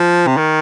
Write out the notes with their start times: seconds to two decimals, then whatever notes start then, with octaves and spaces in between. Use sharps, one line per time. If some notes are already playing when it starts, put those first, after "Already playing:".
Already playing: F3
0.27 C3
0.37 D#3